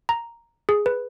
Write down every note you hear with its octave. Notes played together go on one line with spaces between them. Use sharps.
A#5
G#4
B4